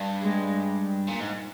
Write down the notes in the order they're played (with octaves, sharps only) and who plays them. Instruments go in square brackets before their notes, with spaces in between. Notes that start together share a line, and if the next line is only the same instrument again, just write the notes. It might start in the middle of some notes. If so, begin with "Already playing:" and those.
Already playing: [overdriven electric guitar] G2
[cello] G#3
[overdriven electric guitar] A#2
G#2